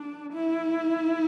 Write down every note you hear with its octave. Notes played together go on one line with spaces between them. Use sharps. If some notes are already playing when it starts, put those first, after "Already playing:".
Already playing: D4
E4